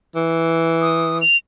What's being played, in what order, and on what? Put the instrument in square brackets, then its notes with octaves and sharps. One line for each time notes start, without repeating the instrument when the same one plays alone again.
[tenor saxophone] E3
[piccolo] D#6
F7